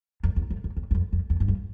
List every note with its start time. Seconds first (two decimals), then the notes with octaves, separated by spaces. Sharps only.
0.23 F2
0.36 E2
0.50 F2
0.64 F2
0.76 E2
0.91 E2
0.95 F2
1.12 F2
1.30 E2
1.40 G2
1.48 F2